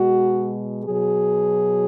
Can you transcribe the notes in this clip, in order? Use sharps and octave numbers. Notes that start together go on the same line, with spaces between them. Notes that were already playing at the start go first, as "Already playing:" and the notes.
Already playing: B2 G#3 F#4
B2 F#3 G#4